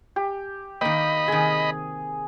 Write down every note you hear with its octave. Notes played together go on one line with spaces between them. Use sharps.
G4
D#3 A#3 D#5 G5 B5
C3 D#3 G#4